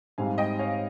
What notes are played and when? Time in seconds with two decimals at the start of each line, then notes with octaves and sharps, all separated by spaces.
0.18 G#2 G3 C4 F5 G#5
0.38 D#5 G5
0.59 C#5 F5